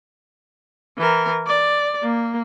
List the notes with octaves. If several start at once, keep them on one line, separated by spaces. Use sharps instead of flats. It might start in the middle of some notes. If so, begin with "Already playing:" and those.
E3 A#4
D5
A#3